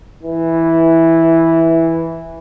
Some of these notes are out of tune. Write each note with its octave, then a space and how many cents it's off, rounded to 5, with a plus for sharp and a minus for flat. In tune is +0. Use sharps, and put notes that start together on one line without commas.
E3 -5